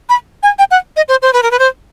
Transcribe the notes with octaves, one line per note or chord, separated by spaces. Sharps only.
B5
G#5
G5
F#5
D#5
C5
C5
B4
A#4
B4
C5